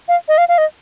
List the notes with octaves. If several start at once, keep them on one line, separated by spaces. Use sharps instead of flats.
F5
D#5
F5
F5
D#5